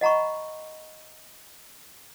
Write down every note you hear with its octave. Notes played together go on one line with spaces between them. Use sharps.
D#5 F#5 A#5 B5 C#6